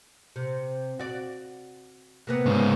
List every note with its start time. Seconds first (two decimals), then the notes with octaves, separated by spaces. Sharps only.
0.36 C3
0.99 F#4 D5
2.27 C3 A#3 B3
2.46 G#2 C#3